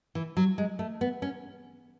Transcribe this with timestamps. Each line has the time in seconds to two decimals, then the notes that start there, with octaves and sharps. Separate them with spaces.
0.15 E3
0.37 F#3
0.58 G#3
0.79 A3
1.01 B3
1.22 C#4